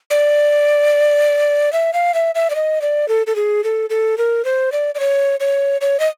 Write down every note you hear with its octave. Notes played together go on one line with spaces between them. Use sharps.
D5
E5
F5
E5
E5
D5
D#5
D5
A4
A4
G#4
A4
A4
A#4
C5
D5
D5
C#5
C#5
C#5
D#5